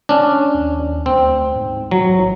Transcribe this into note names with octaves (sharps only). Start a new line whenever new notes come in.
C#4 D4
D#2
D2 C4
G#2
F#3
A1